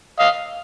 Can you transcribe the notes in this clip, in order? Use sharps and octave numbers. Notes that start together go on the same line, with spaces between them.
D#5 F5